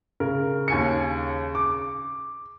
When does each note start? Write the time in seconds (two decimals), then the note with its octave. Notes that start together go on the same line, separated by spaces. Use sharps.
0.20 C#3 A#4
0.68 D#2 G#5 C#7
1.55 D6